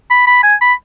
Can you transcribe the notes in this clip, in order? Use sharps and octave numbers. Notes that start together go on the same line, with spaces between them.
B5
B5
G#5
B5